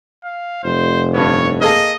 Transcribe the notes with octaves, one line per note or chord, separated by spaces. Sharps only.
F5
F1 C5
G2 D3 B3 C#5
A#3 G#4 A4 D#5